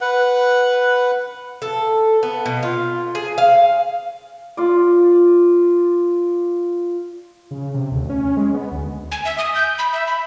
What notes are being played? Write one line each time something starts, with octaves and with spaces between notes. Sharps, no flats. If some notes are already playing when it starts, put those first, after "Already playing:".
B4 F#5
A4
B3
B2
F4
G#4
F5
F4 D5
C#3
C3
D2
C#4
G#3
B3
D2
G#5
E5
D#6
G6
B5
E5
B5